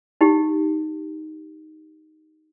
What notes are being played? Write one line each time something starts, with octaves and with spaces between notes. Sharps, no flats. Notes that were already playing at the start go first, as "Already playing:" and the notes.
D#4 G4